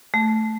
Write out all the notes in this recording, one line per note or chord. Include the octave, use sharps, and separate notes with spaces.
A3